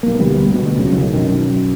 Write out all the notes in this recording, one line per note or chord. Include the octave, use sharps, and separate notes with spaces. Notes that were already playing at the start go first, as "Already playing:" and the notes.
B1 A#3
E1 D2 G3 B3
D2 B2
D1 C#2 C#3 F#3
B1 A2 D#3
B1 F#2 D#3